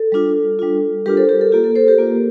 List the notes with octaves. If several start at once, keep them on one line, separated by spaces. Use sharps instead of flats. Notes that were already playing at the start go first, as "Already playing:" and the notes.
Already playing: A4
G3 D4 F4
G3 D4 F4
G3 D4 F4 G4 A#4
A4 C5
G4 A#4
A4
A#3 F4 G4
A4
A4 C5
G4 A#4
A#3 F4